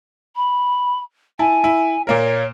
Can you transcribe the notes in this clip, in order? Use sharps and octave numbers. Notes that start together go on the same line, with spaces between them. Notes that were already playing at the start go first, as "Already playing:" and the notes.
B5
E4 G#5 A5
E4
A#2 A#3 A#4 C#5